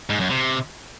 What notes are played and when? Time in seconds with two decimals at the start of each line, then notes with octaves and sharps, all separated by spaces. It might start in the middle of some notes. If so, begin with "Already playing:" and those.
0.10 G#2
0.20 F#2
0.30 C3